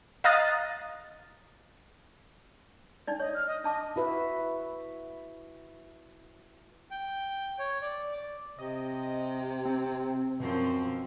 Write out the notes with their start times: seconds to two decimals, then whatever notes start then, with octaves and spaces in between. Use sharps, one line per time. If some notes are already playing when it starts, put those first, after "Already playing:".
0.24 D#5 F5 A#5 D#6 F#6 A6
3.07 D4 D#4 D5
3.20 C#5 D#5
3.34 F6
3.47 D#5
3.64 D4 D#5 A5 D6
3.96 E4 F#4 B4 E5
6.91 G5
7.59 C#5
7.82 D5
8.59 C3 D#5
9.65 C4
10.40 F#2 B2 F3 C4